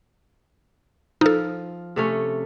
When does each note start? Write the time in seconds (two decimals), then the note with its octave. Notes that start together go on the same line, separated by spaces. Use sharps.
1.21 F3 D#4 A4
1.96 C3 A3 C#4